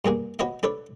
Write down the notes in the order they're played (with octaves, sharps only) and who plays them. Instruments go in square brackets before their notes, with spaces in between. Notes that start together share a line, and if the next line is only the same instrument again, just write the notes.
[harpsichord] G2 A#3 G#4 F5
F#4 B4 C#5 D#5 F5
D4 A4 B4 C#5